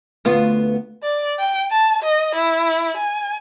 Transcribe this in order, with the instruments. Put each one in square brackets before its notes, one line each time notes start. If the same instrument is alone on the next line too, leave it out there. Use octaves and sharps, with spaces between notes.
[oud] D2 B3 F4
[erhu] D5
G5
A5
D#5
E4
G#5